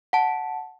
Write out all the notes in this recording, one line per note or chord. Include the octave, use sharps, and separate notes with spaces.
F#5 A5